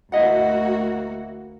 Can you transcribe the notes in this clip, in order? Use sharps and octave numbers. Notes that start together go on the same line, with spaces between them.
D2 A#3 E4 F#4 D#5 F#5